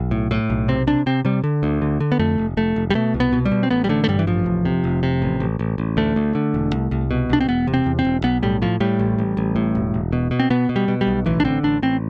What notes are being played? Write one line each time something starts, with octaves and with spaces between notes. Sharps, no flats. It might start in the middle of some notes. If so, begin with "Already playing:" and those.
Already playing: B1
A2
A2
B1
C3 C4
C3 D4
C3 C4
C3 G3
D3
D2
D3
D3
B3
F2 A3
F1
F1 A3
F1
G3
B2 A3
C2
B3
B2
G3
B2
C4
A1 B3
G3
D3 A3
A3
G2 G3
E3
A1 F3
F1
C3
F1
C3
A1
A1
A1
A1
D2 A3
D2
D3
E1
C2
C2
B2
C2 D4
C4
E1 B3
C3
C4
E2
C4
E1
B1 B3
A2 G3
A2 F3
A2 G3
A1
A1
A1
A2
E1
E1
B2
B2
C4
B2 B3
B2
G3
B2
G3
B1
A1 E3
D4
D3 C4
A1 D4
A1 C4